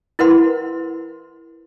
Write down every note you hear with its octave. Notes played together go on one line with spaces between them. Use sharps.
E4 A#4 B4 F#5 C6